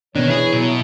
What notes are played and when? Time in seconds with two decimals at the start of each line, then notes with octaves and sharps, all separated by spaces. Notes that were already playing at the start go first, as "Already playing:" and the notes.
0.16 B2 D#3 E3 D4 C#5
0.30 E4 G#4
0.53 B2 F#3